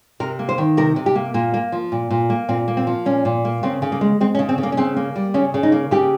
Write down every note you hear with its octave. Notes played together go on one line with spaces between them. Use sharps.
C3 A#4
A#3
C5
D#3
C3 A#4
C3
G4
A#3
A#2 A#3
A#3
F3
A#2
A#2
A#3
A#2 C4
A#3
C4
F3
A#2 C#4
A#2
A#3
C#3 C4
C#3
A#3
G#3
G#3 C4
C#4
C#3
C4
C#3
A#3
C#4
C#3 C4
A#3
G3
C#3 C#4
C#3
D#4
A#3
C#3 G4